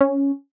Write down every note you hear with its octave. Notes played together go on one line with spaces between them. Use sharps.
C#4